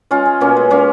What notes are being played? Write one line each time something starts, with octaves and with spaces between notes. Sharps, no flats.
G#3 C#4 F4
G#3
B2 A#3 C#4
G#3
G#3 A#3 C#4